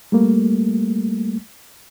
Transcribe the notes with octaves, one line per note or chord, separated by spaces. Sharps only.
G3 A3 A#3